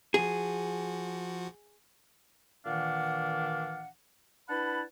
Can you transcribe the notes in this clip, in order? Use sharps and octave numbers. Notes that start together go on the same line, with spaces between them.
F3 F#4 G#4
A#2 D#3 E3 D4 F5 F#5
D4 E4 B4 F#5 A5 B5